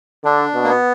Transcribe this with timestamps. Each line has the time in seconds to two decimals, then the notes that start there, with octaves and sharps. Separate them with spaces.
0.25 D3 D4
0.55 B2
0.64 A#3
0.69 B3